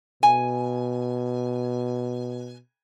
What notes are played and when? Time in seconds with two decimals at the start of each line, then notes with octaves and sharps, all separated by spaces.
0.23 B2 G#5